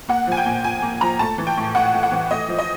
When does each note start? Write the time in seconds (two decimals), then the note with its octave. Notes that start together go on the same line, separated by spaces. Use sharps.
0.09 A#3 F#5
0.27 F3 G#5
0.37 G5
0.46 A#2
0.64 A#2 G#5
0.82 A#3
1.01 F3 A#5
1.19 A3 A5
1.38 E3
1.47 G5
1.57 A2
1.75 A2 F#5
1.94 A3
2.03 F#5
2.12 E3
2.31 A3 D#5
2.48 F3
2.59 D#5